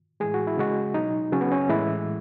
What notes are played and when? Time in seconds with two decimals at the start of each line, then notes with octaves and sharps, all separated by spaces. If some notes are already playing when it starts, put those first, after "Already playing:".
0.20 A2 E3 G#3 G#4
0.34 F#4
0.47 E4
0.57 C#3 G#3 F#4
0.94 B2 F#3 D#4
1.32 C#3 F#3 C#4
1.41 B3
1.52 C#4
1.69 A2 E3 G#3 E4